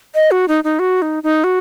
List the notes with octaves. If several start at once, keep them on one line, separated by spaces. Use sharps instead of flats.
D#5
F#4
D#4
D#4
F#4
D#4
D#4
F#4